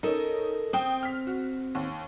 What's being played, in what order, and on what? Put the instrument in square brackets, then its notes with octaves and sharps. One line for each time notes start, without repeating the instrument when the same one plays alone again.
[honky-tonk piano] C#4 D#4 [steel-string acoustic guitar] A4 A#4 D#5
[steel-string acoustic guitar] C4 [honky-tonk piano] G5 D#6
[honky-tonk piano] F6 B6
F#4
D#2